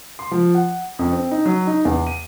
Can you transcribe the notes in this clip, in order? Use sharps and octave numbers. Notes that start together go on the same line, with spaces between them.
C6
F3
F#5
F2
C4
D#4
F#3
D#4
E2
D#7